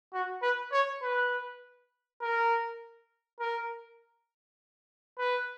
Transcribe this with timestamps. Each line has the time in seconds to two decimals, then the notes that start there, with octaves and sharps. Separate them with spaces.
0.13 F#4
0.42 B4
0.72 C#5
1.02 B4
2.21 A#4
3.40 A#4
5.18 B4